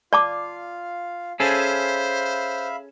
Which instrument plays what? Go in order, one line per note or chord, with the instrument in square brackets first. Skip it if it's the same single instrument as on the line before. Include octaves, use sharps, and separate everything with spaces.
[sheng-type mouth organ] F4 F5 [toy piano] D5 A5 D6
[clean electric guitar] C#4 G#4 A4 [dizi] C5 [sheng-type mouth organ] E5 F5 B5